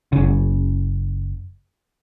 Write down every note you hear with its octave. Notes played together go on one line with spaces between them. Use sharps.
F#1 C#3